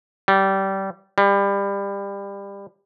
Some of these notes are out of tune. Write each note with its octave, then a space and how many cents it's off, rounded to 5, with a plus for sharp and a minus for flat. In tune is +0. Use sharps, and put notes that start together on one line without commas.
G3 -20
G3 +25